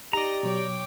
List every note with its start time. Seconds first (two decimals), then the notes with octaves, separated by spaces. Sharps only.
0.13 D#4 G4 D5 D#5 A#5 A#6
0.43 B2 F#3 C#5 G5 D6